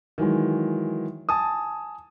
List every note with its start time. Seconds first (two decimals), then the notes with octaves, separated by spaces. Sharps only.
0.18 D#3 E3 F#3 G#3
1.29 G#5 A5 D#6